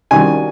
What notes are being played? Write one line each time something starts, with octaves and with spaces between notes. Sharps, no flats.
C2 C3 D#3 F#3 G#5